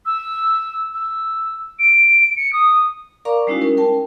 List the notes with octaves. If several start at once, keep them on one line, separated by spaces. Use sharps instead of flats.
E6
E6
D7
C#7
D#6
A#4 D5 F5 A#5 C#6 D6
G3 G#3 C#4 D#4 E4 F#4
C#4 A#4
A#4 G5 A5